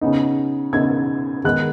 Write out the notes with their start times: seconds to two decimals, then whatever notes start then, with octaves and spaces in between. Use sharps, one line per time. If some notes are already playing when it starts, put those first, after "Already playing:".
0.01 C#3 B3 D#4
0.73 C#3 B3 D#4 G#6
1.44 D#3 G#3 B3 D#4 F#6